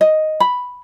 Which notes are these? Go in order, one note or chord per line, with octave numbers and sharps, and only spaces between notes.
D#5
B5